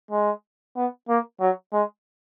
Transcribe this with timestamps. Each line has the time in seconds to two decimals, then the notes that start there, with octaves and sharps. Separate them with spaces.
0.11 G#3
0.76 B3
1.09 A#3
1.40 F#3
1.73 G#3